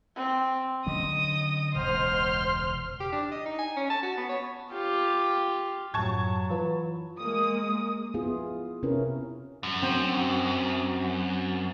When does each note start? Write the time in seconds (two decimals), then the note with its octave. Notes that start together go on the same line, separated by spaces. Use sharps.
0.16 C4
0.87 D3 F#3 C#4 D#5 D#6
1.75 E1 C#2 C5 C6 F6
3.00 G4
3.12 D4
3.31 D#5
3.46 D#4
3.59 G#5
3.76 C#4
3.90 A5
4.03 F#4
4.17 B3
4.29 C#5
4.71 F4 G4
5.94 F#2 A2 F#3 A5 C#6 G#6
6.50 E3 F4 B4
7.18 G#3 A#3 D#6
8.14 B3 E4 F4 G#4
8.83 C3 C4 C#4 E4 A#4 B4
9.63 F#2
9.82 C4